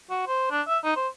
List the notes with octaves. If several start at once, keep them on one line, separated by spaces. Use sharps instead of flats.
F#4
C5
D4
E5
D#4
C5